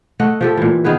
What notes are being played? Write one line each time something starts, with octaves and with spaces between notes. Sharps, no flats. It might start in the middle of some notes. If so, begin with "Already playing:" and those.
A3 D#5 F#5
F3 G4 A4
A#2 E3
D#3 B3 G#4 B4